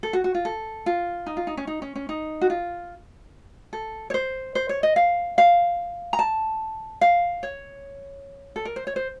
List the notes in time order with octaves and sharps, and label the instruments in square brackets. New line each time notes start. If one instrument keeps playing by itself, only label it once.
[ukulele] A4
F#4
F#4
F4
A4
F4
D#4
F4
D#4
C#4
D#4
C#4
C#4
D#4
F#4
F4
A4
C#5
C5
C5
C#5
D#5
F5
F5
A#5
A5
F5
C#5
A4
A#4
C5
C#5
C5